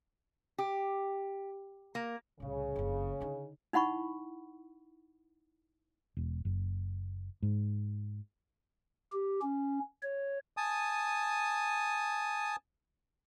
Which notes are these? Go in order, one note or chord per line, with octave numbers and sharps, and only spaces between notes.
G4
A#3
C2 A2 C#3
F#1 F2
D3 D#4
D#4 E4 F#5 B5 C#6
E1
F#1
G#2
G4
C#4
C#5
G#5 A5 D#6